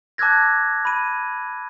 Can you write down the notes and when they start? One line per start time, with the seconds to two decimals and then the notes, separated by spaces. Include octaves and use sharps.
0.18 A5 D6 E6 F#6 G#6 A#6
0.85 B5 D#7